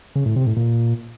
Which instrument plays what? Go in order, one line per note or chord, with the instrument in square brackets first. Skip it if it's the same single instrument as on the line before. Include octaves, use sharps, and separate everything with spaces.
[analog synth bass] C#3
A2
C3
A2
A#2